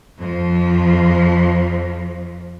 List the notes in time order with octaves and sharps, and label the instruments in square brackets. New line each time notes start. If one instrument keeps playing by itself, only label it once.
[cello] F2 F3